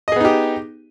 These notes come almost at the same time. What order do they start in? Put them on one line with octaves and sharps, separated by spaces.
D#5 G#4 B3 D#4 G4